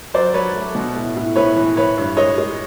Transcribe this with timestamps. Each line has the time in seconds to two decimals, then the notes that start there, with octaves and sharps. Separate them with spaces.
0.14 F#3 C5 D5
0.34 F#3 B4 C#5
0.55 A3
0.75 B2
0.96 A2
1.16 A2
1.36 A2 B4 C#5
1.56 E3
1.76 E3 B4 C#5
1.97 G2
2.17 G#3 C#5 D#5
2.38 G#3